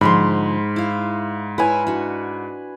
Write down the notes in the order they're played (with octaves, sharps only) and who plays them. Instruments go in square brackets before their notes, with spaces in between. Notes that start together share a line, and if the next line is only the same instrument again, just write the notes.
[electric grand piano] G#2 [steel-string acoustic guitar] D3 F3 G#3 [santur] B5 C6
[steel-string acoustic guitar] E4 F5
[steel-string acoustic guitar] E4 C#5 [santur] B4 G#5
[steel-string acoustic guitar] D4 F#4